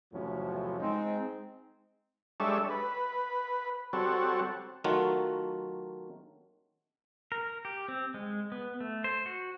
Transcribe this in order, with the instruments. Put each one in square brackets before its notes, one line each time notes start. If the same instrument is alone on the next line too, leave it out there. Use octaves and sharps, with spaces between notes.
[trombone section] E2 A2 C3 F3 F#3 C#4
G#3 C4 D#4
[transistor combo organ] G3 G#3 D4 A4 C#5 E5
B4
G3 C4 F#4 A4 C#5
[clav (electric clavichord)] D#3 F#3 A3 F4 F#4
[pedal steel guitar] A#4
G4
C4
G#3
B3
A3
C5
F#4